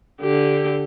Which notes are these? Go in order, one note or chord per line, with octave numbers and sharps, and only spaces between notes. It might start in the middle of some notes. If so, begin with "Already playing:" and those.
D3 G4